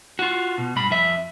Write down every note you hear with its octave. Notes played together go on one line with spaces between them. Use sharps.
F4 F#4
B2
G2 B5
F2 E5